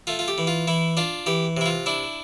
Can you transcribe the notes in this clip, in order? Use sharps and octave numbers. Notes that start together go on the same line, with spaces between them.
A3 F4
F4
G4
E3
F4
E3 E4
D4 F4
E3 G4
C3 E4
F4
D4 E4